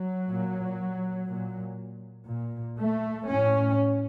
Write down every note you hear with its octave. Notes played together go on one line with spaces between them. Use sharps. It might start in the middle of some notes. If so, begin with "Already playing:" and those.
Already playing: F#3
A#2
A#2
A#2
A3
A2 C#4